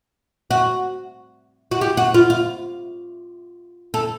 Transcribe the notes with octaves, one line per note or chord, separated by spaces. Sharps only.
F#4
F#4
G4
F#4
F4
F4
A4